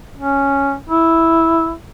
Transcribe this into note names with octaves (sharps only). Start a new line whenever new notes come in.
C#4
E4